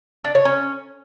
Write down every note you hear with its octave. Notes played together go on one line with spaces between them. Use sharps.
D4
C#5
C#4